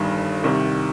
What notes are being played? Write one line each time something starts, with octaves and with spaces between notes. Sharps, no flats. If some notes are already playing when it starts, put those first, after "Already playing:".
Already playing: G1 G2 D#3
C2 C3 D#3